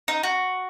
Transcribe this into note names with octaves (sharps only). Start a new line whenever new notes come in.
D#4
F#4